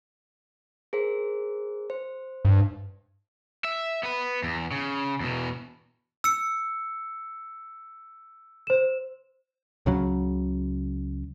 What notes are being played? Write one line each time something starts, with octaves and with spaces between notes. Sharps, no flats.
G#4 A#4 C5
C5
G2
E5
B3 B4
E2
C#3
E2 B2
E6 C#7
C5 E7
C#2 C#3 F#3